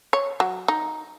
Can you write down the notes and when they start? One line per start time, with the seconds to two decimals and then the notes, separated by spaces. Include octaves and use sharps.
0.13 C#5
0.40 F#3
0.68 D#4